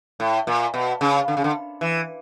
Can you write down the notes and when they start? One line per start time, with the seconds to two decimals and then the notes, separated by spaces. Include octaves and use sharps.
0.20 A2
0.47 A#2
0.74 B2
1.01 C#3
1.28 D3
1.37 C#3
1.44 D3
1.81 E3